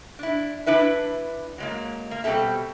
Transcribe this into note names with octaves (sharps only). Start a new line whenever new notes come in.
D4 E4
D4 E4 B4 E5
F#3 G#3 A#3
A#3
B2 G3 B3 C4 A4 E5